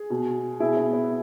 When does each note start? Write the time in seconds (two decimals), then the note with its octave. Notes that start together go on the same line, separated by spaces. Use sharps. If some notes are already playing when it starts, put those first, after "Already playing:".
Already playing: G#4
0.10 B2
0.60 B2 E4 G#4
0.77 B3
0.93 B3